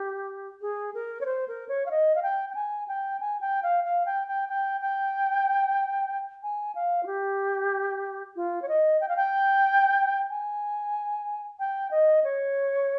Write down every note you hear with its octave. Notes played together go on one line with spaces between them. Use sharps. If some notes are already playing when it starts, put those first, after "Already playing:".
Already playing: G4
G#4
A#4
C#5
C5
A#4
C#5
F5
D#5
F5
G5
G5
G#5
G5
G#5
G5
F5
F5
G5
G5
G5
G5
G#5
F5
F4
G4
F4
C#5
D#5
G5
F5
G5
G#5
G5
D#5
C#5